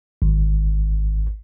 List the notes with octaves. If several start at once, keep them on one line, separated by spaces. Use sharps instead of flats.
G#1